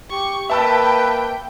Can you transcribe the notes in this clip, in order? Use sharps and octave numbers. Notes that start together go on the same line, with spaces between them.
G4 C#6
A#3 B4 E5 G5 A5 E6